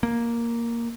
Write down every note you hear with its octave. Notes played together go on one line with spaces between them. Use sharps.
A#3